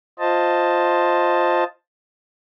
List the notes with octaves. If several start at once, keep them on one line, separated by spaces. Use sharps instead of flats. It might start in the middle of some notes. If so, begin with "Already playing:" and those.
F4 C5 D#5 A5